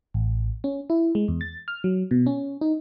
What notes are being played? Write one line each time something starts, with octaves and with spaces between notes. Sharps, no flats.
A1
C#4
E4
G#3
E2
A6
F6
F#3
B2
C#4
D#4